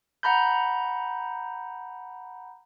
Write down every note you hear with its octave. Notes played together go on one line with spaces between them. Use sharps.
F#5 A#5 B5 G6